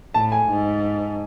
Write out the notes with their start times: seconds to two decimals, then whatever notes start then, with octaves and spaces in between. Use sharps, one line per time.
0.14 A2 A5
0.32 G#5
0.49 G#2